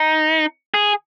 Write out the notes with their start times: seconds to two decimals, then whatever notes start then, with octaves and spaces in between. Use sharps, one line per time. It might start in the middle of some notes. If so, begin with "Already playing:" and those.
Already playing: D#4
0.74 G#4